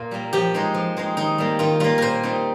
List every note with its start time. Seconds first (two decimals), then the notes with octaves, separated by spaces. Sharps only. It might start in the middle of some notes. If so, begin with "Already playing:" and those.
Already playing: A#2 F4
0.11 G3 A#3
0.33 F3 G4
0.54 G#3 C4 D#4
0.74 F3
0.97 G#3 C4 D#4
1.17 D#3 D#4
1.38 G3 A#3
1.59 D#3 F4
1.80 G3 A#3 F4
1.98 A#2 A#4 C5
2.23 G3 C4 D#4